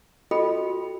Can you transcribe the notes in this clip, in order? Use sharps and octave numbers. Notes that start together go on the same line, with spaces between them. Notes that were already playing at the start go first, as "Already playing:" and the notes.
F4 F#4 A4 D#5 G5 B5